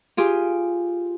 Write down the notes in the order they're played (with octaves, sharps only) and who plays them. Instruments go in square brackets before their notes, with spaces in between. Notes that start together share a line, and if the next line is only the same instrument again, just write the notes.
[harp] F4 G4 G#4